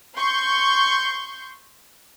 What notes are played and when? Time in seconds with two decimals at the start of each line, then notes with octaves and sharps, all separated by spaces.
0.16 C6 C#6 G6